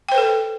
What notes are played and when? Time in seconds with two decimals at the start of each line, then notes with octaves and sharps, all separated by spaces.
0.09 G5
0.12 C5
0.15 B4
0.18 A4